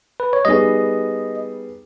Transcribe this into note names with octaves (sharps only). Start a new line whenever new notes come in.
B4
C#5
G3 B3 D#4 G#4 D#5